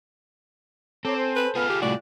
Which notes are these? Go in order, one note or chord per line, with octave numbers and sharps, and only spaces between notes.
C4 A4 C#5 A#5 D6
C5 G#5
B4
B3 F4 G#4 B5 F6
G4
C2 A2 F#4 D5 G5 F#6